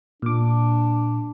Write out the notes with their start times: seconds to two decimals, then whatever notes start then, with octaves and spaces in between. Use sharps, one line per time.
0.22 A#2 D4 D6